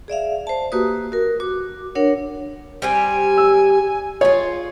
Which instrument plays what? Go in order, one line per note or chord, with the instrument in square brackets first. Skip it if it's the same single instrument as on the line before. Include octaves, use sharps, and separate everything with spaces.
[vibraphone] G#4 D5 E5 F5
C5 A5
A#3 F#4 G4 B4 D#6
F#4 A#4
F#4 D6
D4 A#4 C#5 F#5
[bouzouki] G3 C4 G4 [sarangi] G#5
[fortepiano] E6
[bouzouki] F4 G#4 [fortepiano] C#5